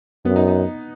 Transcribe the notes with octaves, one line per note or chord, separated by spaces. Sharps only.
F#2 B3
D#4
D#4